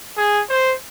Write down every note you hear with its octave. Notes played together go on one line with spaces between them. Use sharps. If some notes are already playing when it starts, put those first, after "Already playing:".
G#4
C5